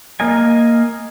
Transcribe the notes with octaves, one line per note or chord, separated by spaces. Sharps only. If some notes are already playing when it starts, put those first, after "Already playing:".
A#3 A#4 D#5 G#5